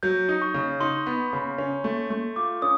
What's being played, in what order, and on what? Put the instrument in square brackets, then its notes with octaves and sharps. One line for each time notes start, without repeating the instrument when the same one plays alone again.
[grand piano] F#3 [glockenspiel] G6
[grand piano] D#4
[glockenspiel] C#6
[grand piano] C#3
[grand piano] D#4 [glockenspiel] C6
[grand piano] B3
C#3
C#4
A3
A3
[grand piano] F4 [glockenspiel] D6
[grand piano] C#4 [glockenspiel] D#6